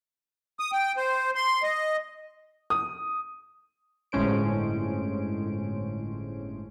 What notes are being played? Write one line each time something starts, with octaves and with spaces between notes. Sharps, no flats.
D#6
G5
C5
C6
D#5
D#6
G1 A2 G#3 C#4 C5 D7